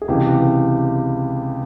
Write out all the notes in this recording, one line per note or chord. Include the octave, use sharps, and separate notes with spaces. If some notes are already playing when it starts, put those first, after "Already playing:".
G#4
C#2 C3 E3 G4